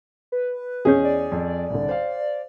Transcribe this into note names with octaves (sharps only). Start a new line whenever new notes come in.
B4
E2 C#4 G#4 D#5 G6
D5
F2
C2 D3
C5 F5